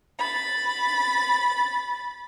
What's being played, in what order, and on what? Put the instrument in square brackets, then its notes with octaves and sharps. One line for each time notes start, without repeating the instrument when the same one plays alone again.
[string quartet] B5 A6